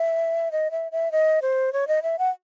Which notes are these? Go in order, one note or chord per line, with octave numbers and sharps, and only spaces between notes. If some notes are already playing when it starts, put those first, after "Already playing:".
Already playing: E5
D#5
E5
E5
D#5
C5
C#5
D#5
E5
F#5